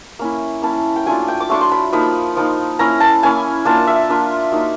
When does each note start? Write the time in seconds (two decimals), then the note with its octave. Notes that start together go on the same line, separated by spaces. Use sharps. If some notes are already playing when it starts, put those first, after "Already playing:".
0.19 A#3 C#4 E4
0.62 A#3 C#4 E4 A5
0.96 G5
1.06 F#3 A3 D4 F4 G#5
1.28 G5
1.40 D6
1.49 F#3 A3 D4 F4 C#6
1.61 C6
1.72 B5
1.93 F3 A#3 D#4 B5
2.36 F3 A#3 D#4
2.79 A#3 C#4 E4 A#5
3.00 A5
3.23 A#3 C#4 E4 G#5
3.65 A#3 D4 F4 A5
3.87 E5
4.09 A#3 D4 F4
4.52 F#3 A#3 D#4